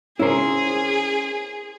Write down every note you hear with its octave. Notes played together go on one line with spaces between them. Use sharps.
C#4 E4 G#4 A#4 C5